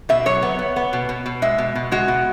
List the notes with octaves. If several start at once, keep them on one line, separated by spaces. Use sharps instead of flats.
B2 E5
F#3 C#5
B3
B3
B3
B2
B2
B2
G#3 E5
B2
B2
G#3 F#4
B2